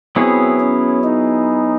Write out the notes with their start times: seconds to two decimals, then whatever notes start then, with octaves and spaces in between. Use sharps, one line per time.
0.16 F#3 B3 C4 E4 G#4 C#5
0.60 C#4
1.04 D#4